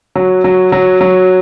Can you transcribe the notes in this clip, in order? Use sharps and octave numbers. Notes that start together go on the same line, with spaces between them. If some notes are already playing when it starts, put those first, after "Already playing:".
F#3
F#3
F#3
F#3